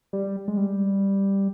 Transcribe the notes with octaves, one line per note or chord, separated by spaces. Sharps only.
G3
G#3
G3